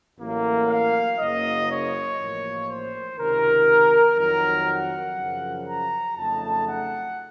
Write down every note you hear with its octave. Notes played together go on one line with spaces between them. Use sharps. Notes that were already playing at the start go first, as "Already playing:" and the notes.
A1 A2 F#3 A#3
F5
F#1 F#2 C#3 F#3 A#3 D#5
C#5
A1 A2 F3 A#3
C5
C#2 C3 D#3 A#4
F2 D#3 F#3 A#4
F#5
F#2 C#3 F3
A#5
F2 C#3 F#3 A3 D#4 A5
F#5